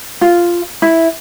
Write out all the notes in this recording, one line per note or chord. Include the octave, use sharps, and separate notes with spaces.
F4
E4